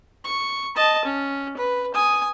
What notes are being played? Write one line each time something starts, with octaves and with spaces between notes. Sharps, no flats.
C#6
D#5 A5
C#4
B4
G#5 D#6